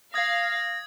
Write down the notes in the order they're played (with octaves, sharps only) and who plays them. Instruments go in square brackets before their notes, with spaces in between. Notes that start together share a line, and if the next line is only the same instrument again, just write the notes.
[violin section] F5 [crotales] D#6 G#6 [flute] A#6